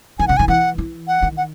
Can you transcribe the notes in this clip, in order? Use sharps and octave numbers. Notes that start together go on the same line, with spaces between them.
D#3 G#5
C#3 F#5
D#3 G#5
E3 F#5
E3
F#5
D#3
F#5